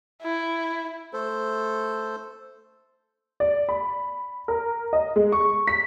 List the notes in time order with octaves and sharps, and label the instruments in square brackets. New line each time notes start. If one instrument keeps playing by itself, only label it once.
[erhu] E4
[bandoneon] A3 A4 C5
[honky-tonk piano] D5
B5
A#4
D#5
G#3
C#6
B6